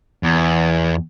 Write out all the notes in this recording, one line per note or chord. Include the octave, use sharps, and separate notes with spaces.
E2